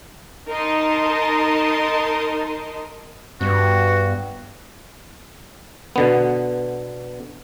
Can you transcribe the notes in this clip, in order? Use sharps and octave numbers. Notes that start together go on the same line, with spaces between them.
D#4 A#4 D#5 A5 C6
G2 B3 F#4
B2 D3 B3